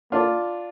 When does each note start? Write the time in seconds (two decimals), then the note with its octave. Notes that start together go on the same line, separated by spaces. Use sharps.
0.12 A#3 D4 F4